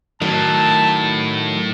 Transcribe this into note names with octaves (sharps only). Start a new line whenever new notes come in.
A2 D#3 F#3 A5